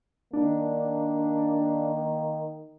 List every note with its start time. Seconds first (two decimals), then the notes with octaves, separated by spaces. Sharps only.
0.33 D#3 A#3 D4